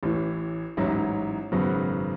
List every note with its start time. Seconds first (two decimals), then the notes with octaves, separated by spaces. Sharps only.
0.03 A1 A2 E3
0.77 A1 G#2 F#3 C#4 E4
1.52 G#1 F#2 C#3 F#3 B3